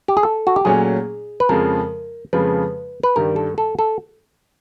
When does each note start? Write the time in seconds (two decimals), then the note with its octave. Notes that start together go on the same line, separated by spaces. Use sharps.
0.08 G4
0.17 G#4
0.23 A4
0.47 F#4
0.56 G4
0.65 A#2 F#3 A3 C#4 G#4
1.40 B4
1.49 F2 C#3 F3 G#3 A#4
2.33 F2 C#3 F3 G#3 B4
3.03 B4
3.16 G2 D#3 G3 A#4
3.36 A4
3.58 A4
3.79 A4